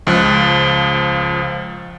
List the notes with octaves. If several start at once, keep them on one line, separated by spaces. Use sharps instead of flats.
C#2 F3 F#6